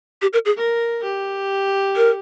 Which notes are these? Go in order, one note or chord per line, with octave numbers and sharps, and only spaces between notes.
G4
A#4
G#4
A#4
G4
A#4